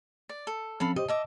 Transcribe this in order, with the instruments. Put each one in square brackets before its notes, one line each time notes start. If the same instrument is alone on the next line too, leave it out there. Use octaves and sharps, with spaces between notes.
[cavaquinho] D5
A4
[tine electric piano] F3 C4 C#4 [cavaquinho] A4 F5 B5
[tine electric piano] G4 C5 [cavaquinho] D#5
[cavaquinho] D#5 E5 D6 [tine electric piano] A5